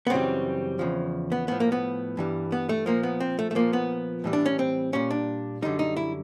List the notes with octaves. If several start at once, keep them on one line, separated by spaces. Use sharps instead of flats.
B3
F#2 C#3 E3 G3 C4
E2 C#3 F3
B3
A2 F3 B3
A#3
B3
G2 E3 G3
B3
A3
A#2 F3 A#3
B3
C4
A3
A3
A#2 F3 A#3
B3
A2 E3 G3
D4
C#4
C4
A#2 G3 C#4
D4
F#2 D3 G3 D#4
D#4
E4